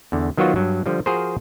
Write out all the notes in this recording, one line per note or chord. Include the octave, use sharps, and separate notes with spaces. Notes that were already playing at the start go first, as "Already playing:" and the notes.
E2 D3
D#3 F#3 B3 F4 F#4 C5
G2 F#3
D3 F3 G3
F3 F#4 G#4 A#4 C5